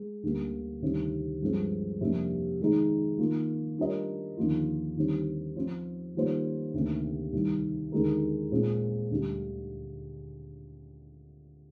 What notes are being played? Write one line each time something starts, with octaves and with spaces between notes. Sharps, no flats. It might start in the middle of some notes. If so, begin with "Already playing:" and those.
Already playing: G#3
D2 D3 G3 A#3
D2 C3 D#3 G3 C4
G2 F3 G#3 C4
F2 C3 G3 A#3 D4
D#3 G#3 D#4
D#3 A#3 F4
G3 D4 F4 A#4 D#5
D#2 D3 F3 A#3 F4
D#2 D3 G3 C4
F3 C4 F4
D#3 G3 A#3 F4 C5
D2 C3 D#3 A#3
C2 C3 D#3
D#2 D3 G#3 D#4 A#4
A#2 G#3 C4
D2 D3 G3